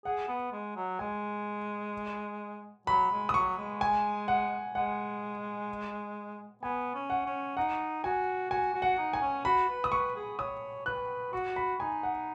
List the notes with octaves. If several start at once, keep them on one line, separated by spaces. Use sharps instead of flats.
G#4 F#5
B3
G#3
F#3
G#3 G#5
F#3 B5
G#3
D#6
F#3 C#6
G#3
G#5
F#5
G#3 F#5
B3 G#5
C#4
F#5
C#4
D#4 F#5
F#4 G#5
F#4 G#5
F#4
F#5
D#4
G#5
C#4
F#4 B5
B4
D#6
B4 C#6
G#4
C#5 D#6
B4 F#6
F#4 C#6
B5
D#4 G#5
F#5